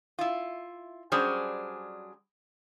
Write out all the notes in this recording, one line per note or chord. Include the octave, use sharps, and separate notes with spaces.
E4 F4
F#3 G3 C#4 D4 G#4 C5